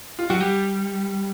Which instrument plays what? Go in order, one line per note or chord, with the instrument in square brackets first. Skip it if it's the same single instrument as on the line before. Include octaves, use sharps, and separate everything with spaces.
[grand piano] F4
[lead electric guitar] F#3 [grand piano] F#4
[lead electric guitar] G3 [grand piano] G4